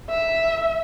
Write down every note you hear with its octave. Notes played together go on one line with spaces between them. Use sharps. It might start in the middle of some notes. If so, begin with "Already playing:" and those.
E5